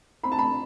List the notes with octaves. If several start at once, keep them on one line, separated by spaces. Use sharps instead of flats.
C4 B5
A5
B5